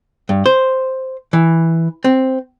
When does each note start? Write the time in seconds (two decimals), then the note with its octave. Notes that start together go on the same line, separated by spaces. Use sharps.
0.29 G2
0.46 C5
1.33 E3
2.04 C4